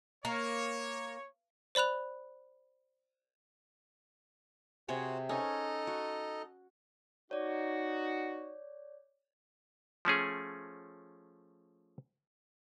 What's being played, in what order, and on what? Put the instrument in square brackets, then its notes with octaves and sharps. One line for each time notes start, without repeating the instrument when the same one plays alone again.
[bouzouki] A#3 [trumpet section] C#5
[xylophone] C5 D5 B5 F#6 F7
[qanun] C3 G#4 C#5 [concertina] F#4 C5
[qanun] C#4 [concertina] D#4 A4 D#5
[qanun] F#4
[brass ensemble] D#4 F#4 [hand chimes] C#5 D5
[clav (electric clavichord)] F3 A3 C#4 G#4